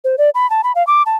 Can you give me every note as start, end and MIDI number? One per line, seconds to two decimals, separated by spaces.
0.04 0.16 72
0.18 0.30 74
0.35 0.49 83
0.50 0.61 81
0.64 0.72 83
0.75 0.85 77
0.87 1.03 86
1.06 1.17 81